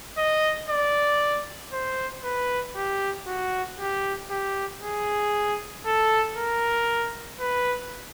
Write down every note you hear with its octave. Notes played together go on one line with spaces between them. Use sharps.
D#5
D5
C5
B4
G4
F#4
G4
G4
G#4
A4
A#4
B4